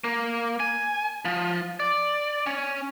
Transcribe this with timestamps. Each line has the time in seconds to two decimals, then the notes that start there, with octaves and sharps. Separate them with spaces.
0.04 A#3
0.60 G#5
1.25 F3
1.80 D5
2.46 C#4